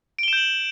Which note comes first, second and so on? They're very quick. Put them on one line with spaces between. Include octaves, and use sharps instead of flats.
D7 G7 E7 G6 F#7